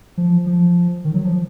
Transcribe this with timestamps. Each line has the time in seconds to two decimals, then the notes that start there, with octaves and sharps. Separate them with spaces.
0.17 F3
0.46 F3
1.05 D#3
1.14 F#3
1.25 F3